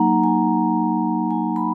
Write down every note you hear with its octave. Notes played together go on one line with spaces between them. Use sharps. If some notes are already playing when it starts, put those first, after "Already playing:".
Already playing: F#3 A#3 D#4 F#5 G#5 A#5
G#5
G#5
B5